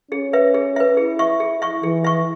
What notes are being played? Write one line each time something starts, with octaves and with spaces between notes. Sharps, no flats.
C#4 G#4
B4 E5
G#4
B4 E5
E4 G#4
E5 C#6
G#4
E5 C#6
E3 G#4
E5 C#6